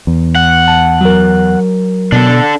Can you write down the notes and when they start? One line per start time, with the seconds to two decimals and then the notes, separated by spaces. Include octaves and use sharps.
0.07 E2
0.35 F#5
0.68 A5
1.01 F#3 A#4
2.12 B2 B3 D4 A4